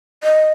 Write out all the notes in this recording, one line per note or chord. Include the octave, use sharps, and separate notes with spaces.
D#5